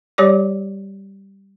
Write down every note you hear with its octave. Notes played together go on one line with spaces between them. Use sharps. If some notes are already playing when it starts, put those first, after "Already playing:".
G3 G4 C#5 D5 D6